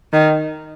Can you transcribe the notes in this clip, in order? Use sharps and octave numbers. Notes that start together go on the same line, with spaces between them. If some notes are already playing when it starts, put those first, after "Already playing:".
D#3